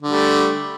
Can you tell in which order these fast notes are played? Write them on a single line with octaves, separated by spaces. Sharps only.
D3 G3 A3